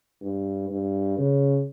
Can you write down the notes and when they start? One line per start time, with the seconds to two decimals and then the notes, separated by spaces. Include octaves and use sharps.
0.21 G2
0.70 G2
1.18 C#3